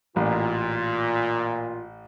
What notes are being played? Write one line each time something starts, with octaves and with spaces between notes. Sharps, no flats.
A1 A#2 F4